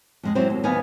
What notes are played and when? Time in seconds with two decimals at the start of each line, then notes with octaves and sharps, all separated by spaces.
0.23 F2 G#3 G#4
0.35 F#3 C4 E4 G4 C5
0.50 D#2
0.64 D#2 B3 D#4 B4 F5 G#5